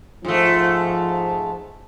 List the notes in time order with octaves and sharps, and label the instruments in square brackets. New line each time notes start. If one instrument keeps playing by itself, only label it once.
[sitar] G#2 A3 [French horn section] F3